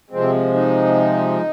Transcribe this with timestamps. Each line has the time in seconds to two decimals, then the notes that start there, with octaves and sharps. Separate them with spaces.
0.10 C3 F3 G#3 C4
0.54 D#4